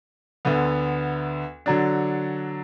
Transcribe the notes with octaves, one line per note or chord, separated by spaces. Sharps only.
D2 D3 B3
D3 F#3 D4